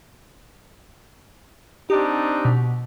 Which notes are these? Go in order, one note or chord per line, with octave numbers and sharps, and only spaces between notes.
C4 D4 D#4 G4
B2